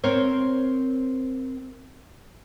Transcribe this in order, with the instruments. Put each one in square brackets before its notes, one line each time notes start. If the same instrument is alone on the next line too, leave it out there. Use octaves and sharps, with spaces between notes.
[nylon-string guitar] C4 A#4 C5 C#5